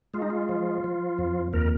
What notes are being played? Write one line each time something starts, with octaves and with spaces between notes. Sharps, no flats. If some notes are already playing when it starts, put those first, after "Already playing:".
G#3 F4
D#4
F4
F3
F3
F2
D#2 A#4